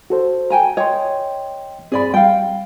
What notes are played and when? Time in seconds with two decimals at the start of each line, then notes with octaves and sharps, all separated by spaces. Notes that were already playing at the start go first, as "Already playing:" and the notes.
0.10 F#4 A4 C5
0.50 G5 G#5 A#5
0.77 C#5 D#5 G5 C6
1.92 G2 C4 G#4 D5 B5
2.14 G3 F5 G5